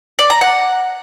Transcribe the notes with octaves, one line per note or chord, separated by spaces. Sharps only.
D5
A#5
F#5